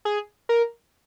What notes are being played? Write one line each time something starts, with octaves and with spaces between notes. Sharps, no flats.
G#4
A#4